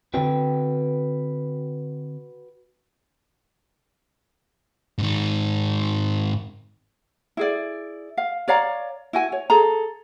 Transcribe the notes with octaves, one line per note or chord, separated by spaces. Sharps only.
D3 C4 F#4 B4 G5
G#2 D#3
E4 G#4 D5
F5
C#5 D5 F5 A#5
E4 F#4 G#5
C#5
G#4 A4 A#5